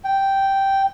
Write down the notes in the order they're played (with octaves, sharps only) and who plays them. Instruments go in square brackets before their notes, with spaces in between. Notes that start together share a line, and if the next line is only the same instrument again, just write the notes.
[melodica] G5